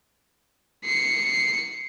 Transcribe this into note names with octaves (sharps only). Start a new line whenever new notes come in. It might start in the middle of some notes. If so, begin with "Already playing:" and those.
C7 C#7